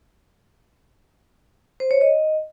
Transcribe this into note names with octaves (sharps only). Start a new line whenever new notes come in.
C5
C#5
D#5